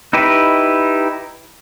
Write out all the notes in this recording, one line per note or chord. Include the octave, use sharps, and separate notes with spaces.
D#4 E4 G4 B4